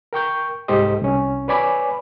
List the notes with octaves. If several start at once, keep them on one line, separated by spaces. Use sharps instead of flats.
A#4 G5 C#6 G6
C2 G#2 G4 A4 C5 D#5
C2 C#4
B4 C#5 D5 G#5 B5 D6